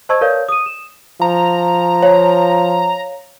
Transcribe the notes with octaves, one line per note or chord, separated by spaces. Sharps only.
C5 D#5 A5 C#6 E6 G#6
A#4 B4 C#5 D5 F5 G6
D#6 D#7
E7
F3 A#5
C#5 F5